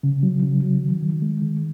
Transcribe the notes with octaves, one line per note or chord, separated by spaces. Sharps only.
C#3
F#3
C#3
F#3
D#3
D#3
G#3
D#3